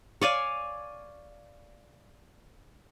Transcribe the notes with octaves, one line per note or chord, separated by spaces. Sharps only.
C#5 D5 F5 G#5